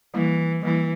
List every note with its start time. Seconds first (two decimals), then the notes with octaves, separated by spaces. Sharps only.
0.14 E3 G3 A#3 E4
0.63 E3 G3 A#3 E4